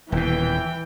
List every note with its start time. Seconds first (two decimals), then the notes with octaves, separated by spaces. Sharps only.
0.12 D#1 B2 E3 G5